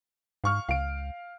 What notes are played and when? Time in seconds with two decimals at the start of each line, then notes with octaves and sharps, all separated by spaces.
0.44 G#2 F5 C#6 F6
0.69 C#2 F5 D7